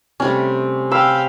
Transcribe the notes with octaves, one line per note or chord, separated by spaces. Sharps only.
C3 G3 A3 C#4
F5 G5 B5 E6